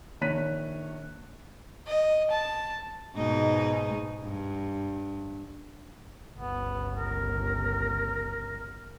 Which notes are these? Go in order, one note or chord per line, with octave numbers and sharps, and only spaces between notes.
A#1 D#3 C#5 F#6 B6 D#7
D#5
A5
G#2 B2 D#4
G2
G1 C#2 B3
A#4